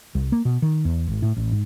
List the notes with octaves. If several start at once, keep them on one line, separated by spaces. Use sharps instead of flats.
C2
A#3
B2
D#3
E2
G#1
A2
A1
G#2